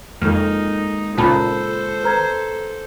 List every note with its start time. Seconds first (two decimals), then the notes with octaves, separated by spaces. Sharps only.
0.22 F2 D#3 G#3 A#3 D#4 A4 F6
1.17 C#2 A#2 F4 A4 C5 A5 B5
2.04 B4 A#5 G#6